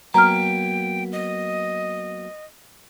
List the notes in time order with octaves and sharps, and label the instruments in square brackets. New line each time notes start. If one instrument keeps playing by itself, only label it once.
[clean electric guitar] F#3 A#3 B3 [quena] G5 [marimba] A#5 F6
[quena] D#5